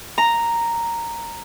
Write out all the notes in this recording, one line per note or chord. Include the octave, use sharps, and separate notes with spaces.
A#5